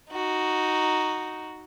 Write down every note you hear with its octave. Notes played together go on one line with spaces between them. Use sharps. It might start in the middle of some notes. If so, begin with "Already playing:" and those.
D#4 F#4